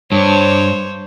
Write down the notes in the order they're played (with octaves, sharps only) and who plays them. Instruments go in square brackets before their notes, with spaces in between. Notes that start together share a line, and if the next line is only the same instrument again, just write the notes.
[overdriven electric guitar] G2 [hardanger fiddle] C5 C#5